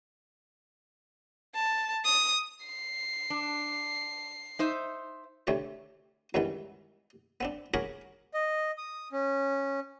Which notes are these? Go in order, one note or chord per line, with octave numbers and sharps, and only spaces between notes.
A5
D#6
C7
D4
D#4 C5 E5
D2 C3 A3 C#5 D5
C#2 G2 D#3 E3 B3
B3 C4 D4
F#4 G#4 A#4 C#5 B5 D6
D#5
D#6
C#4